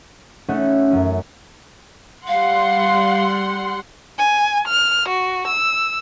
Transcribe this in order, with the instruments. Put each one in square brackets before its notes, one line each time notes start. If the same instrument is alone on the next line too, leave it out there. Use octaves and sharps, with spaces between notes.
[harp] A3 C#4 D#4 E4 C#5 F#5
F#2 F#3 C#4
[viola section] G3 F#5 C6 [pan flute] F5
[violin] G#5
F6
F#4
E6